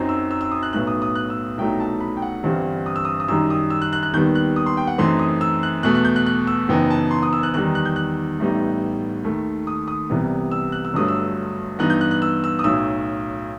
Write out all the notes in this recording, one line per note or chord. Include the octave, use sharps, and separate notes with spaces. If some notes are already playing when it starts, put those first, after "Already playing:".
Already playing: F#2 F#3 C4 D#4
E6
E6
E6
D#6
F#6
B1 A2 F#3 B3 F#6
D#6
D#6
F#6
E6
C2 B2 F#3 A3 D#4 G5
A5
B5
G5
F#5
G1 G2 E3 G3 C4
D#6
E6
D#6
D#6
F#2 D#3 G3 D#4 E6
D#6
E6
F#6
F#6
F#6
D#2 D#3 G3 B3 G6
F#6
D#6
C6
G5
F#5
F#2 E3 A3 C4 D#4 C6
D#6
E6
F#6
E2 B2 A3 F#6
F#6
G6
F#6
F#6
E6
F#1 F#2 E3 B3 D#4 G5
A5
C6
D#6
E6
F#6
E2 D#3 G3 D#4 F#6
F#6
G6
F#6
A1 A2 G3 B3 D#4
D#2 D#3 A3
D#6
D#6
C2 C3 E3 G3 B3
E6
F#6
E6
G1 G2 F#3 A3 D#6
E6
G2 E3 B3 D#4 F#6
G6
F#6
F#6
E6
E6
D#6
B1 A2 F#3 E6